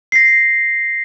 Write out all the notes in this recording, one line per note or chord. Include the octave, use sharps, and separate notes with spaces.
A#6 C7